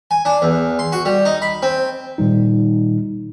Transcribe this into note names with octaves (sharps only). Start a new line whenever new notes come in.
G#5
D4
E2
C6
F#4
G3
D#4
B5
C4
A#2 D#3 G3 D#4